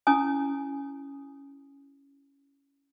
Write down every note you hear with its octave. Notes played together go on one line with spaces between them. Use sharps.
C#4 E4 G#5 D#6